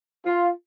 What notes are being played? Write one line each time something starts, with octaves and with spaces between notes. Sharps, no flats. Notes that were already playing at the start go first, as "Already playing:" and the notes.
F4